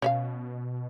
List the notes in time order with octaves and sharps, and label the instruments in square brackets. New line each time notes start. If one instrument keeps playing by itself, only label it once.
[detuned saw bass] B2 [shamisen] C#4 E5 F5